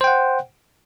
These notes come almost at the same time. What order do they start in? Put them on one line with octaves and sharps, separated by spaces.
C5 G5 F#5